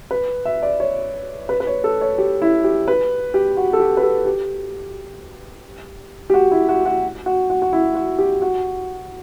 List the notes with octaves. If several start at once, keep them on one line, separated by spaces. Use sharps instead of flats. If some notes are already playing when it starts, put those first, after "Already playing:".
B4
E5
D5
C#5
B4
B4
C#5
A4
C#5
G4
E4
G4
B4
G4
F#4
A4
G4
B4
A4
G4
G4
F#4
E4
F#4
F#4
F#4
F#4
F#4
E4
F#4
G4
F#4